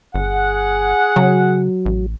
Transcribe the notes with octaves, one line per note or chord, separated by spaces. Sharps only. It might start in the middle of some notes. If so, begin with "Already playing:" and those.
G1 G#4 F#5
C#3 F#3
A1